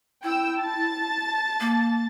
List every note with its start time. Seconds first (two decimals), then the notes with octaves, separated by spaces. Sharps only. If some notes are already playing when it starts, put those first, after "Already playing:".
0.23 E4 G5 E6
0.61 A5 A6
1.60 A#3